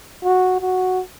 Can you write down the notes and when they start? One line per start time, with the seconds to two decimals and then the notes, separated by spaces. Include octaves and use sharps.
0.24 F#4
0.61 F#4